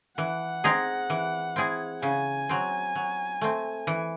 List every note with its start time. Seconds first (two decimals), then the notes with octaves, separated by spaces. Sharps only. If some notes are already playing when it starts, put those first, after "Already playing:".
0.18 E3 F#5
0.64 C4 D#4 G#4
1.10 E3
1.56 C4 E4 G#4
2.02 C#3 G#5
2.49 F#3 C4
2.95 F#3
3.41 A3 C4
3.87 E3